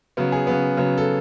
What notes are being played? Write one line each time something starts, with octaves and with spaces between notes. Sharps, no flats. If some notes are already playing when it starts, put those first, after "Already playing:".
C#3 F#3 B3
G#4
C#3 F#3 B3
C#3 F#3 B3
A4